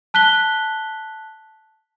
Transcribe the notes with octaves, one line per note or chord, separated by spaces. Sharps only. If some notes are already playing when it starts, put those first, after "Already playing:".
A5 F#6 B6 G7